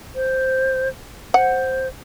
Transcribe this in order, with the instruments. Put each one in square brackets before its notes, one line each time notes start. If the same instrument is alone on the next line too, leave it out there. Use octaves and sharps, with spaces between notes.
[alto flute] C5
[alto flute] C5 [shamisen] F#5